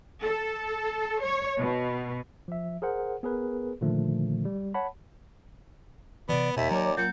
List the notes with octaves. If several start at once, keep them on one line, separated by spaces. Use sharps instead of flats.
A4
C#5
B2
F3 E5
G#4 A#4 C5 F#5
B3 G#4 A#4 B4
A#2 D3 D#3 F3 A3
G3
C#5 F#5 A5 B5
C3 E3 B3 D5
E1 D#2 B2 E5
F#3 C#5 D5 A#5 D6
A#2 F#3 A#3 C#4 G6